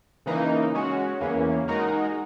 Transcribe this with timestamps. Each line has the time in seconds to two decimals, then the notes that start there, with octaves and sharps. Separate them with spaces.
0.26 C#3 E3 A#3 D#4
0.74 G#3 C#4 F#4
1.21 E2 C#3 E3 A#3 C#4
1.68 G#3 D#4 F#4 A#4